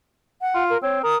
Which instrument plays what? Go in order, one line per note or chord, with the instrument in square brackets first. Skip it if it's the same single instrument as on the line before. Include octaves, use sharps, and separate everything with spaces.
[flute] F#5
[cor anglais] F4
[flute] A#4
[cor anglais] C4 [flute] C#5
[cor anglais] A#4 [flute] D#6